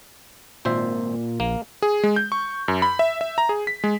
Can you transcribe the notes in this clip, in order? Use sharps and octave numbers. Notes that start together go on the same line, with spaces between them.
G#1 A#2 C5 E5
A#1 A#3
G#4
G#3
G6
C#6
F#2
B5
E5
E5
A#5
G#4
B6
G#3